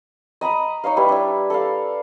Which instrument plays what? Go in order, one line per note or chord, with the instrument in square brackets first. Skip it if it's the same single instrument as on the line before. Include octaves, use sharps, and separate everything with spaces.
[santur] D#5 A#5 B5 D#6
D#4 C#5 D#5 F5
G3 E4 B4
D4 E5
A4 D5 F5